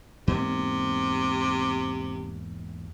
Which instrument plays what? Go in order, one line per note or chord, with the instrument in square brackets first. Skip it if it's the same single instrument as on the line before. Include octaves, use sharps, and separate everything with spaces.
[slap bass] E2 G#2 A#3 [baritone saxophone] C3